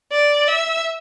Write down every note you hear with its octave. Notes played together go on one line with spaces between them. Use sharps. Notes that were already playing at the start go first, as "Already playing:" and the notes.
D5
E5